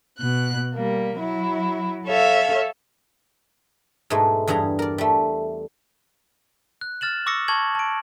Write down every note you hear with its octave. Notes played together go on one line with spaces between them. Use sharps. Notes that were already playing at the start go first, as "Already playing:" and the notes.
B2 F#6
G3 A#3
F#3 E4
A4 C#5 E5 F5
G#2 B2 G#3 A3
E2 G2 G3 G#4 A#5
A#4 D5
G3 A3
F#6
F6 A6 E7 F#7
C#6 D6 E6 A#6 C#7
A5 C#6 G#6 F#7
A5 D7